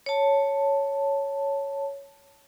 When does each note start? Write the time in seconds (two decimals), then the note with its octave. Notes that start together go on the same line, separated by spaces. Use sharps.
0.06 C#5 A5